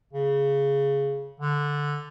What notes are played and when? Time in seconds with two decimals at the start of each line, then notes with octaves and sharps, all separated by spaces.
0.13 C#3
1.40 D3